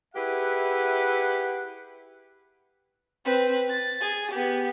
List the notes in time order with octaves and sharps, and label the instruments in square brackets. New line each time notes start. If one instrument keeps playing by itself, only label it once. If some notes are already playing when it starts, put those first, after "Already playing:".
[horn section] E4 G4 G#4 B4 E5 F#5
[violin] C4 B4
A6
G#4
B3 G4